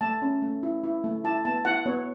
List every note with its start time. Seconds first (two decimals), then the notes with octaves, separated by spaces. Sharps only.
0.01 A3 A5
0.22 C#4
0.42 A3
0.63 E4
0.84 E4
1.04 A3
1.24 E4 A5
1.45 B3 A5
1.65 E4 F#5
1.86 B3 C#5